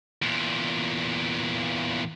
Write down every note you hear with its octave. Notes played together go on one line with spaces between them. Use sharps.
E2 A#2